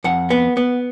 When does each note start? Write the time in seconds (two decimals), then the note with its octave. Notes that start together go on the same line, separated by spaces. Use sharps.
0.04 F2 F#5
0.30 B3
0.57 B3